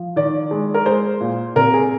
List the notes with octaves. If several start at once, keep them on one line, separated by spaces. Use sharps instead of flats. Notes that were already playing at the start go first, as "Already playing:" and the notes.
Already playing: F3
D#3 D5
G#3
A#4
G#3 C5
A#2
C3 A#4
G#4